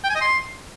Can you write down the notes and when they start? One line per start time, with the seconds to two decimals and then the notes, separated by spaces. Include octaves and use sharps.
0.04 G5
0.10 G#5
0.15 D#5
0.21 C6